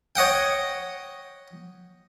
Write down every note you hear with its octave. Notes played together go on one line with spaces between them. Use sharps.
C#5 D#5 F#5 G5